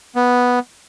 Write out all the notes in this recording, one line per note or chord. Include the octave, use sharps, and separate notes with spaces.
B3